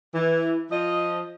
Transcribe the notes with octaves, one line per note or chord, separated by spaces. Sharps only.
E3
F3 D#5